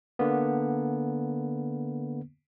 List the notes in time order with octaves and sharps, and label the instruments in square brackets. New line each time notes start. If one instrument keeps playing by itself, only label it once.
[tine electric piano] D3 A#3 B3